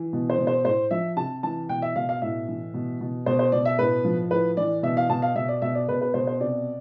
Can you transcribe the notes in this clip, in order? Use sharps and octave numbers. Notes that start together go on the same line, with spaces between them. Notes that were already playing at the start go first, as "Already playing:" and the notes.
Already playing: E3
B2
C5
B2
C5
A2 C5
F3 E5
C3 A5
E3 A5
B2 G5
E5
B2 F5
F5
A2 E5
E3
B2
B2
B2 C5
C5
B2 D5
E5
A2 B4
F3
A2 B4
E3 D5
B2 E5
F5
B2 A5
F5
B2 E5
D5
B2 E5
D5
B2 B4
B4
B2 C5
C5
C3 D5